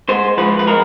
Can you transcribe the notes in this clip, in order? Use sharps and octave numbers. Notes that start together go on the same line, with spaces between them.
G#3 C5
F3 B4
B4
G#3 A#4